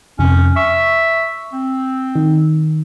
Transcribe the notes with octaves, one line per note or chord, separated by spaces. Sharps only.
F2 C3 C#4
E5 C#6
C4
D#3